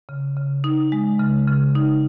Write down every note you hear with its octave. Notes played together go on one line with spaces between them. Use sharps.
C#3
C#3
D#4
G#3
C#3
C#3
D#4